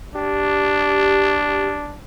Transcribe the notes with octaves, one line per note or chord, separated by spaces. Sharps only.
D4 G4